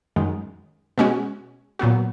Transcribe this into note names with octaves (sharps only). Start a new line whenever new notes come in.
F#2 D#3 G#3
B2 G#3 C#4 F#4
A#2 F#3 B3 F#4